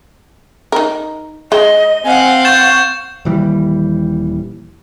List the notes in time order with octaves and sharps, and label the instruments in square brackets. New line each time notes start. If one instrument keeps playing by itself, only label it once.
[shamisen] D#4 A#4
[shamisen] G#3 [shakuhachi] D#5 [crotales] G7
[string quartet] C4 F5 F#5 [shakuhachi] G#5
[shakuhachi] C#6 [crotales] G6 A6 E7
[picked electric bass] D#1 D#2 E3 G3